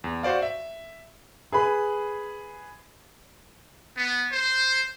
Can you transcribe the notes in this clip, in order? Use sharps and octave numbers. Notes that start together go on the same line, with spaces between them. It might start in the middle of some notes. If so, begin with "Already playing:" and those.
E2
F#4 C5 D5 F5
E5
G#4 B4 B5
B3
C5